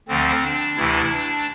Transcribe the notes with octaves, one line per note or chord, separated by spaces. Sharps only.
D2 D3 F3 C4
D4
D2 C3 E3 E4
D4